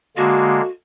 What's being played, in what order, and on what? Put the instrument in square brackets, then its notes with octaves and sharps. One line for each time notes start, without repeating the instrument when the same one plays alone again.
[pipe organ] D3 G#3 A#3 [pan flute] F#4